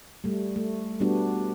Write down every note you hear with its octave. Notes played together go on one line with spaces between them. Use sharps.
G3 A3
A3
G3 A3 B3 D4 F#4